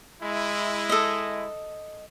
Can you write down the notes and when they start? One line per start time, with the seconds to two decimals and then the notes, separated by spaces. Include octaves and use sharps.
0.23 G#3 E4
0.89 A4 D#5